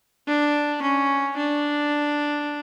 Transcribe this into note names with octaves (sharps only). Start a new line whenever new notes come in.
D4
C#4
D4